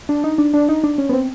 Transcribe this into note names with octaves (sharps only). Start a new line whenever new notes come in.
D4
D#4
D4
D4
D#4
D4
C#4
B3
C4